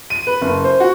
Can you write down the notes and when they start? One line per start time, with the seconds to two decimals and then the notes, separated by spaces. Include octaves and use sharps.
0.10 D#7
0.27 B4
0.41 F#1
0.64 C5
0.80 F#4